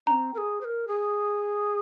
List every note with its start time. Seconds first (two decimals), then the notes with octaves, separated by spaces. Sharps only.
0.07 C4 D4 A#5
0.34 A#4
0.38 G#4
0.61 C5
0.65 A#4
0.88 G#4